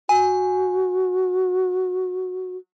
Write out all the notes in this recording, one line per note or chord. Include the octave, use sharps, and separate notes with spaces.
F#4 G#5